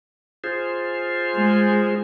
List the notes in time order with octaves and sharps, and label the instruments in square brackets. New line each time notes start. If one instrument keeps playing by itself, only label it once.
[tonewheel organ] F4 G#4 C5
[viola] G#3